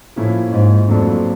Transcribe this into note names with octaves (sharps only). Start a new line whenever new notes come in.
A2 F3 A#3 C#4 E4
G#2
F2 A2 F#3 A#3 D4